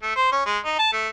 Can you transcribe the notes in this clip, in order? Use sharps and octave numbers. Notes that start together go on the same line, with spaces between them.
A3
C5
C#4
G#3
D#4
A5
A3